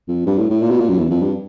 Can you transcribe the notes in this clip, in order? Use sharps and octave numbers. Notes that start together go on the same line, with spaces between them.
F2
G2
A2
A2
A#2
B2
A#2
F#2
E2
F2
G2